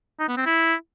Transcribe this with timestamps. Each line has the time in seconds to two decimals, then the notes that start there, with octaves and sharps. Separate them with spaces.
0.20 D#4
0.28 B3
0.37 C4
0.46 E4